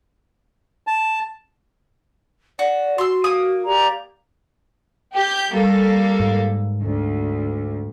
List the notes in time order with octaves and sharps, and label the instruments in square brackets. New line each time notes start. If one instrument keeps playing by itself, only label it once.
[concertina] A5
[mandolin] F#4 [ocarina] D5
[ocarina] F#4 [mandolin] C6 E6
[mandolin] A#3 D#6
[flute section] G4 D5 A#5
[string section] G4 G6
G3 A#3 A4
[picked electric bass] G#2
[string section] D2